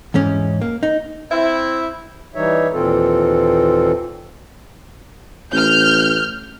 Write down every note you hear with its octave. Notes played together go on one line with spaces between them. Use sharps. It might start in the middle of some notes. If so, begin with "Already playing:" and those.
E2 G#2 C#4
A#3
D#4
C4 E4
E3 G3 D#4 C#5 E5
D#2 A#2 E3 C4 F4 A4
A1 F6 G6